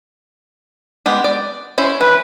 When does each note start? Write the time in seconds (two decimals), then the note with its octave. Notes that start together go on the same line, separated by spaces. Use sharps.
1.06 G#3 B3 G4
1.24 D5
1.78 C#4 E4 C5
2.01 E3 B4